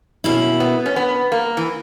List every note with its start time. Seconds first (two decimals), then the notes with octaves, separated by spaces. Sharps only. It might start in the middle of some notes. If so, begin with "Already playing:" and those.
0.24 B2 A#3 C#4 E4
0.60 B3
0.86 C#4
0.96 B3
1.32 A#3
1.57 E3